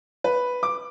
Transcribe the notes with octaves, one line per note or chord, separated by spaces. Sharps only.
B4
D6